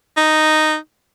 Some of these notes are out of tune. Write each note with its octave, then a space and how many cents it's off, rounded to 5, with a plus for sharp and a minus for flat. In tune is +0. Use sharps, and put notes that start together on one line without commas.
D#4 -5